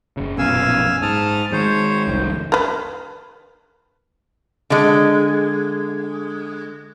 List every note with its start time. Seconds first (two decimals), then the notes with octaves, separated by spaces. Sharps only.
0.17 F#1 C#3
0.38 A#1 F#2 B2 F5 G#5 E6
1.02 G#2 A5 D#6 F6
1.52 D#3 G#3 C5 C#5
2.07 F1 C2 D#3
2.52 A#4 B4
4.70 D3 G#3